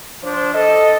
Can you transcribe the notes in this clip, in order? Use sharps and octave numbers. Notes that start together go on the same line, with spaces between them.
F3 D4 C5
A4 D#5